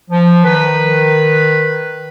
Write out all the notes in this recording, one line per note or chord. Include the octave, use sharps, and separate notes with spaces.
F3
D#3 B4